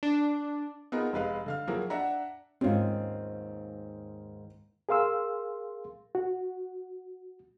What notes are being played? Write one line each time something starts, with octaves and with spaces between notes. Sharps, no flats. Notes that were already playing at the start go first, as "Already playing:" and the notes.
D4
B3 D#4 F4 G#4 A#4
F1 G#3 B4 F5
D3 F5 F6
F3 F#3 A#3 E4 G#4 A#4
D4 E5 F#5 A#5
D#2 G#2 C4 C#4 F4
G#4 A#4 F5 C6 E6
F#4